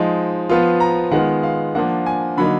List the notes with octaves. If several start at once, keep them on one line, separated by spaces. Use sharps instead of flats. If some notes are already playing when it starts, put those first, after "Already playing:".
Already playing: F3 G#3 D#4
F3 B3 F4
A#5
D#3 G#3 B3 F4 F#5
F5
F3 A#3 D4 F#5
G#5
D3 F#3 A#3 D#4 B5